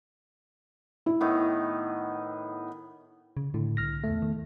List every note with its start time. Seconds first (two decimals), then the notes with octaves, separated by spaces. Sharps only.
1.06 E4
1.21 A2 D#3 B3
3.37 C#3
3.54 A2 D3
3.77 C2 F6 A#6
4.04 E2 A3
4.22 D#3